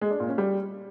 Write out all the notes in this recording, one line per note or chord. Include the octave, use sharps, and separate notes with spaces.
G#3
D4
A#2
C#4
G3